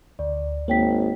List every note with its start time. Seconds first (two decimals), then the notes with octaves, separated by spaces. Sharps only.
0.19 D2 D5
0.68 G#1 A#3 C#5 G5 B6